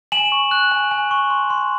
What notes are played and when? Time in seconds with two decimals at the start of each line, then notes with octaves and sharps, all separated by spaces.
0.12 G#5 E7 F#7
0.32 C#6
0.51 F#6
0.71 G#5
0.91 G#5
1.11 C#6
1.30 C6
1.50 C6